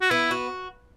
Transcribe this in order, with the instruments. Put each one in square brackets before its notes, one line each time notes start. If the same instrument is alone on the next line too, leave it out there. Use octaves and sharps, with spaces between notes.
[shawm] F#4
[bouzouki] B3 [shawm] E4
[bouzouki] F#4